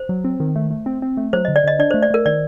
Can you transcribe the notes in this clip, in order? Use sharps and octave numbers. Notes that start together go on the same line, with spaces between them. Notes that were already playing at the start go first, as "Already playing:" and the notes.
Already playing: C5
F#3
C4
D#3
A3
A3
C4
C4
A3
F#3 C5
D#5
D3
D5
D3 D#5
D4 D5
C5
A3
D5
A3 A#4
D#3 D5